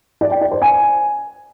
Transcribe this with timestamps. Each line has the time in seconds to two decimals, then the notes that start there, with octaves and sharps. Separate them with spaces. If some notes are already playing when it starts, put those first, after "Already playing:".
0.21 D5
0.31 G5
0.41 D5
0.51 C5
0.62 G#5